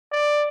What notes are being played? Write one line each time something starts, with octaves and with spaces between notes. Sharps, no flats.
D5